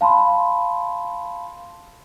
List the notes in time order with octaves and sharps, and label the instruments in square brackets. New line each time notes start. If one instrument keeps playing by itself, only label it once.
[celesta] F5 A5 B5 C6